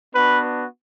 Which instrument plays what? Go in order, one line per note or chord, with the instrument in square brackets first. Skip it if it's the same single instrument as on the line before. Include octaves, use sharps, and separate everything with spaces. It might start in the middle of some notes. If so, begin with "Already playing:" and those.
[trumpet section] B3 D4 F#4 B4